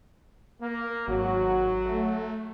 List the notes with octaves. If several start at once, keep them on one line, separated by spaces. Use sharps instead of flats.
A#3
G#1 F#3 F#4
A3